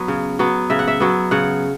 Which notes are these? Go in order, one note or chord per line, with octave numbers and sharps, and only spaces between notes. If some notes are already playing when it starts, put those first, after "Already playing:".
Already playing: F#3 B3
C#3
F#3 B3
C#3 E5
F#5
E5
F#3 B3
C#3 F#5